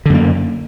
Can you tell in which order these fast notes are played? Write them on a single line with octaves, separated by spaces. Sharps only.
D3 F#2 A#3